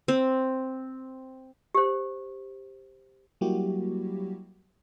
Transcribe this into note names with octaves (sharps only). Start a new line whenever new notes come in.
C4
G4 C5
F#3 G3 A#3 E4 F#4 G4